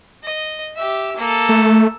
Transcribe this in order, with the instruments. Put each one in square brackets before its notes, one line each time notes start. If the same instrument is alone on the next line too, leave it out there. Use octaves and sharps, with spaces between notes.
[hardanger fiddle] D#5
G4 E5
A#3 A4
[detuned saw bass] A3